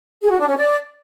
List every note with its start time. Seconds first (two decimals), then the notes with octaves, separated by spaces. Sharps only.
0.21 G#4
0.30 F#4
0.39 D4
0.47 C#4
0.56 D5